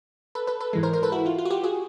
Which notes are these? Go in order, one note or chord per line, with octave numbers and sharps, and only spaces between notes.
A4 B4
A4 B4
A4 B4
G#2 E3 G#3
A#4 C5
A#4 C5
A4 B4
E4 F#4
F4
F4
F#4
F4 G4
F#4 G#4